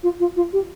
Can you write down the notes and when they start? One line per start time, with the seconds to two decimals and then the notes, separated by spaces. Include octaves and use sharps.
0.03 F4
0.20 F4
0.36 F4
0.53 G4